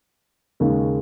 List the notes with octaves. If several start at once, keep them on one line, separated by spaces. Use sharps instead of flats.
D#2 C#3 G#3